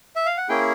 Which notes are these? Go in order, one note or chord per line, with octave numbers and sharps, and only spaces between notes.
E5
F5
F#5
A#3 C#4 E4 G#4 G5